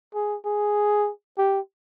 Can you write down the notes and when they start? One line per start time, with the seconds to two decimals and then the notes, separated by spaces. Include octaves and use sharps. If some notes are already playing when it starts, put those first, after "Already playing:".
0.14 G#4
0.45 G#4
1.38 G4